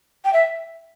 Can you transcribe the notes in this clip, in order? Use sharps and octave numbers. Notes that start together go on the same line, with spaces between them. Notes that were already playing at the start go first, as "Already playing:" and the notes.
G5
E5